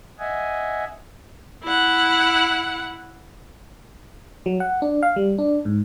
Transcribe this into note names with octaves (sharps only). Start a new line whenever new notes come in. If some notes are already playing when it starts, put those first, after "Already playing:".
D#5 E5 F#5 G#5
E4 F#5
F#3
F#5
D4
F5
G3
D4
G#2